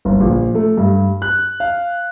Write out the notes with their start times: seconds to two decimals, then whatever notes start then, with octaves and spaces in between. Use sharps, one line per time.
0.05 G1
0.20 A#1
0.55 A3
0.77 G2
1.22 F#6
1.60 F5